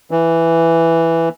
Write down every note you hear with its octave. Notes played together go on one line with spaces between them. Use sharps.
E3